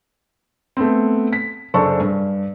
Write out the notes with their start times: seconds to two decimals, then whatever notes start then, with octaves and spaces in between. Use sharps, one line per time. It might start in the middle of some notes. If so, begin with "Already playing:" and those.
0.77 A3 B3 C4
1.33 B6
1.74 F#1 D4 A4 C5 C#6
2.00 G2